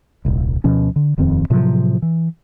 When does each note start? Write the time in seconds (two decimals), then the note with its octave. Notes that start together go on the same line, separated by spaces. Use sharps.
0.25 D#1 C2
0.64 D2 B2 F3 C#4
0.96 D3
1.18 D#1 F2 D#3 C4
1.50 A2 C3 F3 F#3
2.02 E3